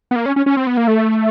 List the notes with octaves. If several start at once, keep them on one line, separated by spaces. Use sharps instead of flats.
B3
A#3
C#4
C#4
C#4
C4
B3
A#3
A3